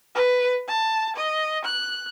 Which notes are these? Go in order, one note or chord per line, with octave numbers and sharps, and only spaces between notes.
B4
A5
D#5
F#6